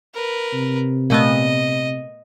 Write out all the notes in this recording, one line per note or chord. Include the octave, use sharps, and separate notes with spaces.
A#4 B4
C3
A#2 A3 B3 D#5